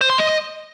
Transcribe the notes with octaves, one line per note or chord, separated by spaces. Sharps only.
C5
C6
D#5